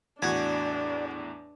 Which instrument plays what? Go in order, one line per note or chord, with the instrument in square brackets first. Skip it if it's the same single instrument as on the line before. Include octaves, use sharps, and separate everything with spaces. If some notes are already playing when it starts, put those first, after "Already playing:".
[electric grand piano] E2 A2 [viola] D4 [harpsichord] F#4 G#5 [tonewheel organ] D5